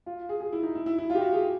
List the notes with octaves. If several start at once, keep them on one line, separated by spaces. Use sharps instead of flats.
F4
G#4
G#4
E4
D#4
E4
E4
E4
F4
G4
F#4
G#4